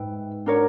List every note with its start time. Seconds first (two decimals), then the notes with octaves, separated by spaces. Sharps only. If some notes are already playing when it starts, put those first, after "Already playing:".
Already playing: G#2 B4 E5 G5
0.46 D4 F#4 A#4 C#5